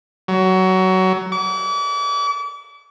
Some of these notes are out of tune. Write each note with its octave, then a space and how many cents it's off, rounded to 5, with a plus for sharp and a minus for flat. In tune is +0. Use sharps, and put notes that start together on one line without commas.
F#3 +20
D6 -40